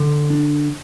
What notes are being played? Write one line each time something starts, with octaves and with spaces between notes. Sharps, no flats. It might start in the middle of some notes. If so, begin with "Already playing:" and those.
Already playing: D3
D4